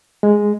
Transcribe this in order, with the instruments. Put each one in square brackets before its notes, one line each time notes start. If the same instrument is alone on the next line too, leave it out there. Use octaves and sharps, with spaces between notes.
[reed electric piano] G#3